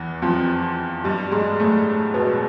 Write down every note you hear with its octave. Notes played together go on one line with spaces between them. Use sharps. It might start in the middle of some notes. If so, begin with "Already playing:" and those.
Already playing: E2 E3
F2 F3
G2 G3
G#2 G#3
A2 A3
B2 B3